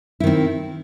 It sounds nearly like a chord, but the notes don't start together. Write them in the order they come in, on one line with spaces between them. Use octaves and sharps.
E4 D#3 C4